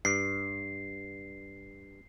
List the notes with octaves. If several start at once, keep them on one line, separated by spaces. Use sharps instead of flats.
G2 C7